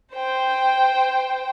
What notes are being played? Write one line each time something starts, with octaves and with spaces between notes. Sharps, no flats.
C5 G5